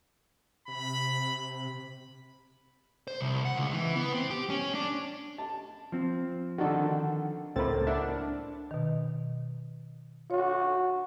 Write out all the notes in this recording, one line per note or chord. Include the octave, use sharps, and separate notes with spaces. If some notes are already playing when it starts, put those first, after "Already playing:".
C3 B5
C5
C2
F#5
C#2
E3
B3
C4
G4
C#4
D4
A5
F3 C4
D3 D#3 D4 F#4 A4
C#2 A2 A#3 C4 A4 B5 A6
D4 A#4 D5 E5 F#5
B2 D#3
F#4 C#5